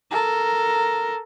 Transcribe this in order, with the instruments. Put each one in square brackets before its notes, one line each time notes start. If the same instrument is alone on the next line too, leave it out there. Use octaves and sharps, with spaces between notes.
[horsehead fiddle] A4 A#4